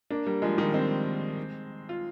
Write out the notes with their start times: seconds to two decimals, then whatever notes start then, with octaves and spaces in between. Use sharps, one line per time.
0.10 A#3 D4
0.26 G3 A#3
0.42 F3 G#3
0.58 D#3 G3
0.74 G#3 C4
1.89 F4